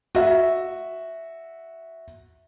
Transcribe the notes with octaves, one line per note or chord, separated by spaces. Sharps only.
F#4 E5